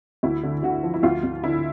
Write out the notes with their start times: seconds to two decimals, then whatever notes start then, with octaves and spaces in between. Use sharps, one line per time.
0.23 D2 E4
0.43 D3
0.63 D3 F#4
0.83 F3
0.94 E4
1.03 D2 F4
1.23 D2
1.44 D3 E4